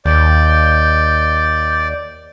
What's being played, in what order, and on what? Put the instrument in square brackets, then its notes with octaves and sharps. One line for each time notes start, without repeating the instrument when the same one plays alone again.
[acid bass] D#2 [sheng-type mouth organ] D5 [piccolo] G6